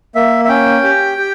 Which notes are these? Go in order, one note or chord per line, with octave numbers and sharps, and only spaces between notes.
A#3 E5
E5
C#4 G5
G4
G4